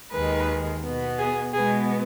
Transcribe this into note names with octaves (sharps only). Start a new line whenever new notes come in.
D#2 D#3 G#3 B4
B2 B3
G#4
B2 G#3 B3 G#4